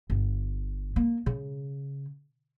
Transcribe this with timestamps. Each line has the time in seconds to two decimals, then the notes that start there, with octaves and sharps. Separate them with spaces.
0.10 G1
0.96 A#3
1.26 C#3